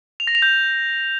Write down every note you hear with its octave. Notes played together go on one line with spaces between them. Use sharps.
F7
A#6
F7
G6